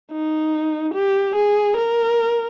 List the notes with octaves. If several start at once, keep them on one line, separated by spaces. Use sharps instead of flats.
D#4
G4
G#4
A#4